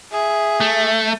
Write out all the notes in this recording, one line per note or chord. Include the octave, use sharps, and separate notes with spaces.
G#4 E5
A3